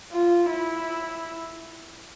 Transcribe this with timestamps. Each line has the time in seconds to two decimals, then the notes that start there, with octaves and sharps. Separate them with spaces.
0.12 F4
0.51 E4